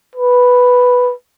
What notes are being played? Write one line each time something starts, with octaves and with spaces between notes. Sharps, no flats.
B4